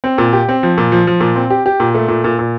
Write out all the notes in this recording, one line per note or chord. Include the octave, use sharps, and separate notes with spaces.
C4
A#2
G4
C4
F3
A#2
F3
F3
A#2
C4
G4
G4
A#2
A3
A#2
A#2
A#2